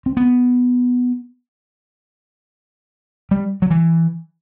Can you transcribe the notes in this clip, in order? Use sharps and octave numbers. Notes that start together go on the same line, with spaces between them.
C4
B3
G3
F#3
E3